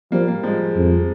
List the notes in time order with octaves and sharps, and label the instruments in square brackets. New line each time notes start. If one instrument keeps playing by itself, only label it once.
[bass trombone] F3 [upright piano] G3 A#3
[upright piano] G3 A#3
F3 G#3
[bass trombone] F2